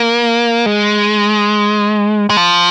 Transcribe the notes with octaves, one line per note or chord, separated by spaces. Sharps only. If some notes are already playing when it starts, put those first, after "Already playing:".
Already playing: A#3
G#3
G#3
F3